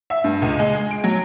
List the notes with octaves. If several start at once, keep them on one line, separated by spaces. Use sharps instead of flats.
E5
G2
C#2
G#3
G#4
D7
F#3